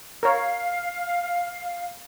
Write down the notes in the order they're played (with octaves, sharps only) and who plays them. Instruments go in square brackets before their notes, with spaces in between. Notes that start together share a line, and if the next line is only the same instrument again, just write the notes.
[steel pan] A#4 C#5 [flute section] F5